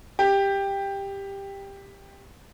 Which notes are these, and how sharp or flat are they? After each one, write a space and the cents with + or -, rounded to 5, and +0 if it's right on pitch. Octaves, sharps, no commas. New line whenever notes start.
G4 +10